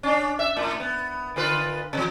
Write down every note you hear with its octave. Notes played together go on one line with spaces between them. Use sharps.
C#4 D4
E5
A2
B3
D3 F4 B4
C3 F3